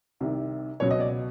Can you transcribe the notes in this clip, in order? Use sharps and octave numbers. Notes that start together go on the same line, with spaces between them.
C2 C3 D#3
C#2 B2 F#3 C#5
D#5
D5